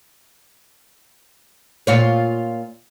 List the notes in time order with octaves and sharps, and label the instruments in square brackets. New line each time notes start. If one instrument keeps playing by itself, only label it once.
[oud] A#2 F4 C#5